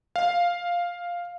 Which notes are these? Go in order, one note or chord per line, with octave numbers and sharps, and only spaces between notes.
F5